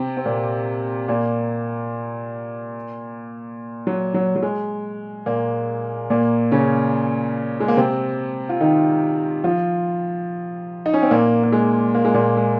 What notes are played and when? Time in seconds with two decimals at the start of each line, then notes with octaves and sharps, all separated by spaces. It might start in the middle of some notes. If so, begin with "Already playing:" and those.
Already playing: C3 C4
0.17 C4
0.25 A#2 A#3
1.08 A#2 A#3
3.87 F#3
4.14 F#3
4.36 F#3
4.42 G#3
5.26 A#2 A#3
6.10 A#2 A#3
6.51 C#3 C#4
7.60 G#3
7.68 A#3
7.77 C3 C4
8.49 F4
8.61 D#3 D#4
9.44 F3 F4
10.86 D#4
10.94 C#4
11.02 C4
11.11 A#2 A#3
11.44 A#3
11.52 G#3
11.95 A#3
12.05 G#3
12.14 A#2 A#3
12.37 G#3